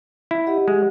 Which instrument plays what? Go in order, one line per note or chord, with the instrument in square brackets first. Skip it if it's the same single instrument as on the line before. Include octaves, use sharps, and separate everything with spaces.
[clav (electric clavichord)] E4
[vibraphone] G4 D#5 F#5
[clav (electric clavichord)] G#3